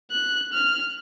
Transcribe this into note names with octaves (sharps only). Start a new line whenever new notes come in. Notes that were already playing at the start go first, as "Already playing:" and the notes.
F#6
F6